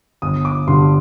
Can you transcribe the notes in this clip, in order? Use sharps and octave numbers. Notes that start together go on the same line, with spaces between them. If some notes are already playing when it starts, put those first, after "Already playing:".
G1 D#6
D6
G2 D3 G3 C6